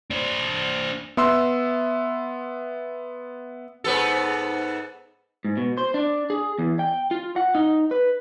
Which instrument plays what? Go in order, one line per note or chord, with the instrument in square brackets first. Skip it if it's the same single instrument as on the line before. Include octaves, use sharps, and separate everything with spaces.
[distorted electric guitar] D4 C5
[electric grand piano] B3 E5 C6 E6
[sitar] G#2 B3 A4
[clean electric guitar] G#2
B2
C5
D4
G#4
E2
G5
F4
F#5
D#4
B4